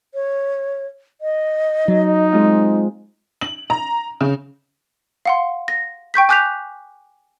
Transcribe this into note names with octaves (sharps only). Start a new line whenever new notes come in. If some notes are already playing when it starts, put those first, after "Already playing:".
C#5
D#5
F#3 D#4
G#3 C4 F4
F#7
A#5
C#3
F5 F#5 C6
A#6
G5 C#6 G6 B6
G#5 D6 F#6 G6 B6 F7